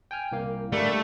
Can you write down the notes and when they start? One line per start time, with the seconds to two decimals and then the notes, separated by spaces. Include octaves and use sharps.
0.11 G5 G#5 F6
0.32 C2 A#3 F5
0.73 G3 A3 A#3 D4